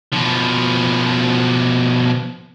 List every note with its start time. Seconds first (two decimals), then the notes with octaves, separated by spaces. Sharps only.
0.13 B2 F3